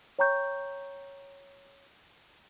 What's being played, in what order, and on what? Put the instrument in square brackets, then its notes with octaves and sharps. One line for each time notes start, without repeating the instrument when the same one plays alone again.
[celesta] C#5 G5 A#5 C#6 G6